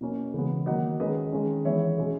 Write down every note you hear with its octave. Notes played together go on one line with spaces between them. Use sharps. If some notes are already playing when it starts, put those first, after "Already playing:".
B2 A#3 C#4
C#3 E3 G#3 B3
D#3 F#3 A#3 D#5 F#5
D#3 G#3 C#4 B4 D#5
D#3 G#3 C#4
E3 G#3 B3 C#5 E5
B2 G#3 C#4